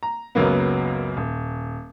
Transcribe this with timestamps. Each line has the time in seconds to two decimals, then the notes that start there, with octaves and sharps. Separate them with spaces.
0.03 A#5
0.35 C#2 F#2 C#3 F#3 A#3 B3
1.17 D#1